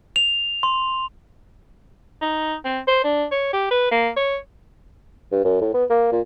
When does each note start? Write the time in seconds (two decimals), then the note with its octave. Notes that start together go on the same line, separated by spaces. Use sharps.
0.16 F7
0.63 C6
2.22 D#4
2.65 C4
2.88 C5
3.04 D4
3.32 C#5
3.53 G4
3.71 B4
3.92 A#3
4.17 C#5
5.32 G2
5.44 F#2
5.61 A2
5.74 B3
5.90 A#3
6.12 A#2